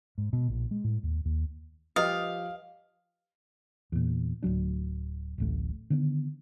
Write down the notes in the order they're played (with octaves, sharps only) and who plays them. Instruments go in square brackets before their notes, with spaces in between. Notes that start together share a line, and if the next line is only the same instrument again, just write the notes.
[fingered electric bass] G#2
B2
A#1
G#3
A2
D#2
D#2
[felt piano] F3 G4 [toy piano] B4 D#5 D#6 [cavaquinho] F5
[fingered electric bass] E2 A#2
D1 F#2 F#3 D4
D1 A1 A3
D3 D#3 B3